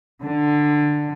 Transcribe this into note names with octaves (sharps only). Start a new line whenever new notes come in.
D3